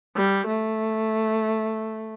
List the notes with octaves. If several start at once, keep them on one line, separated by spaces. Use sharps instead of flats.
G3
A3